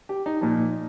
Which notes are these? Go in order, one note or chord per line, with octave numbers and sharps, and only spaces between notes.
G4
D#4
A#2 F3 D#4